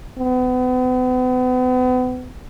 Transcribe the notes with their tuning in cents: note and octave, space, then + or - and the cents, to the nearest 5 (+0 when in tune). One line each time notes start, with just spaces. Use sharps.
B3 +40